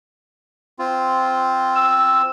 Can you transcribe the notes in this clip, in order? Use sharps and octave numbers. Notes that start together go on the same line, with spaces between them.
C4 F4
E6